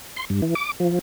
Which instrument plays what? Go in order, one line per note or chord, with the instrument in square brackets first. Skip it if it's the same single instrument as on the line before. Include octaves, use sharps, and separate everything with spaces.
[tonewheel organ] C6
G2
E3
D6
F3